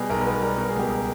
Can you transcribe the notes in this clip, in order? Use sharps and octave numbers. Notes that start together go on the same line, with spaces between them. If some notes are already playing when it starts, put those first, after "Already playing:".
Already playing: B2 G3 G#4
B1 A#4
B4
B3 A#4
G3 A#4
B2 A#4
G#4
C#2 G4